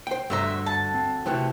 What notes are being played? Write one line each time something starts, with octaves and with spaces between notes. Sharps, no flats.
C5 G5
D2 G2 D3 A3 C5 E5 A#5
A5
C4
C3 E3 F3 A3 F#4 G5